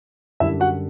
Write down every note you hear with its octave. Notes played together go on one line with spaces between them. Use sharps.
F#2 D3 G3 D4 E4 E5
F#4 F#5